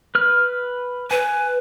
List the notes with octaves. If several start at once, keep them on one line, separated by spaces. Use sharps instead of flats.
B4 F6
B4 G#5